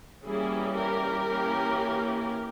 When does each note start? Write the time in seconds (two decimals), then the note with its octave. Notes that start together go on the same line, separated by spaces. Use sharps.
0.25 E3 G3 A#3 C#4 E4 G#4
0.76 G4 A#4
1.27 E3 A#3 C#4